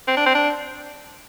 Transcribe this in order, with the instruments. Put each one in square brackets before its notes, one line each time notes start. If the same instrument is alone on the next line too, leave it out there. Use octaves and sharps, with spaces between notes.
[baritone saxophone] C4
D4
C4
D4